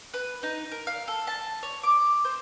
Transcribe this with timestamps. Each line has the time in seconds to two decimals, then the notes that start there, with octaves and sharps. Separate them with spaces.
0.14 B4
0.43 D#4
0.71 A#4
0.87 F5
1.08 A4
1.27 A5
1.63 C#5
1.83 D6
2.25 C5